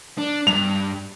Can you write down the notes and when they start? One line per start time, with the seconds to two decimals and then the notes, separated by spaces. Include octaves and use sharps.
0.18 D4
0.47 G2 F7